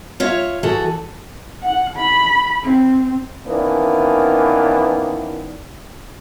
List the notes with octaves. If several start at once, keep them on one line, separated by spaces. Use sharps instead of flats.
F4 C#5 E5
E3 F#4 G#4 A4
F#5
B5
C4
D#3 E3 A#3 B3 C#4 D4